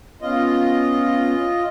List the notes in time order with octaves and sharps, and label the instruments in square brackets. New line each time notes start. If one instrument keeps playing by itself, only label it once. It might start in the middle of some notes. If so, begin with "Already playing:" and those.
[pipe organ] B3 C#4 [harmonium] F4 D#5